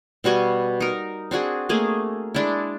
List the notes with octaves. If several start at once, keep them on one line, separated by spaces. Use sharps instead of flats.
B2 G3 F#4 G#5
D#4 A#4
C4 D4 F#4 G#4
A3 A#3 G#4
G#3 D4 E4